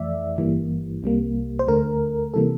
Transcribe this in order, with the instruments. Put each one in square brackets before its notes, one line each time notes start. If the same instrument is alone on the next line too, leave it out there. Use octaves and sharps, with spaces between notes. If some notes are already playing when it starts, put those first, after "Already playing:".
Already playing: [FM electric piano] F2 E3 A3 D5 E5
G1 G2 E3 G3 A#3
C2 C3 G3 A#3
C5
D2 D3 A3 A#4
C3 E3 G3 A#3 A4